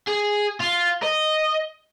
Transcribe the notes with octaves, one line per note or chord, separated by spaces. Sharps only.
G#4
F4
D#5